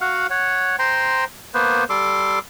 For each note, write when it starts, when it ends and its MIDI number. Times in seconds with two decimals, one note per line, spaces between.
0.01 0.27 66
0.01 0.27 77
0.01 0.27 78
0.30 0.76 73
0.30 0.76 78
0.79 1.24 72
0.79 1.24 79
0.79 1.24 82
0.79 1.24 84
1.54 1.84 58
1.54 1.84 59
1.54 1.84 71
1.54 1.84 72
1.89 2.39 55
1.89 2.39 69
1.89 2.39 84
1.89 2.39 86